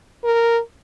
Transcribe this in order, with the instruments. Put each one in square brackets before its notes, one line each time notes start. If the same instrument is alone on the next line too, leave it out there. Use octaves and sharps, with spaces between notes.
[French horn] A#4